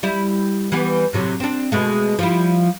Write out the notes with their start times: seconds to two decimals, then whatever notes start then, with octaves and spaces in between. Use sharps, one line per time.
0.03 G3 E4
0.72 E3 G3 B3
1.13 A2 C3 F#3
1.40 C4 D4
1.72 B2 G#3 A3
2.19 F3 G3 E4